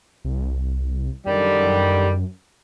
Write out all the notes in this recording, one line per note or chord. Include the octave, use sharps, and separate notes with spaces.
C2
F#2 D3 D#3 G3